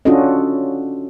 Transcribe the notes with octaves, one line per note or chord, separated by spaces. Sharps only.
C#4 D4 F4 F#4 A4 D#5